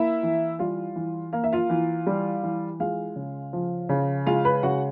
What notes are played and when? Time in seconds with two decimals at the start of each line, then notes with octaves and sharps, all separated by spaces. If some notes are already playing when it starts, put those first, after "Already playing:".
Already playing: A#3 E4 E5
0.23 E3
0.59 G3 F4 F5
0.96 E3
1.33 A#3 F5
1.44 E5
1.53 F4 F5
1.70 E3
2.07 G3
2.43 E3
2.80 G#3 F4 F5
3.16 C#3
3.53 F3
3.89 C#3
4.26 G#3 F4 F5
4.45 B4 B5
4.63 C#3 F#4 F#5